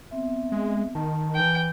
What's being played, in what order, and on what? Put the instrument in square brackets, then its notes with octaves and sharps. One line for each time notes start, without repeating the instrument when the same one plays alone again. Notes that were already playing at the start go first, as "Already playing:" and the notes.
[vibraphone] B3 C4 E5
[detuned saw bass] G#3
[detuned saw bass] D#3 [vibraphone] A5
[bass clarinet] E3 [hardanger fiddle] G5